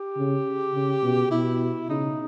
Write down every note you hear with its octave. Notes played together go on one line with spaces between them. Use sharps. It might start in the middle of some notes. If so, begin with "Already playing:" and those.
Already playing: G4
C#3
C#3
B2
B2 E4
C#3 D#4